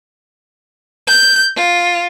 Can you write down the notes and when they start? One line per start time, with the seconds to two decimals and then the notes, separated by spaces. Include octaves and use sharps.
1.07 G6
1.56 F4